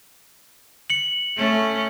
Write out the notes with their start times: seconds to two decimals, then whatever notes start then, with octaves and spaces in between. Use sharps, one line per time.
0.90 C#7 F#7
1.37 A3 C#4